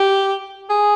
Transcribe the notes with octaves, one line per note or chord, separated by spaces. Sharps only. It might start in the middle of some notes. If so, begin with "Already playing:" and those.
Already playing: G4
G#4